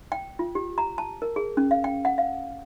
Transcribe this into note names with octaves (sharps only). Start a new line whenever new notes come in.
G5
F4
G4
A#5
A5
A#4
G#4
C#4
F5
G5
F#5
F5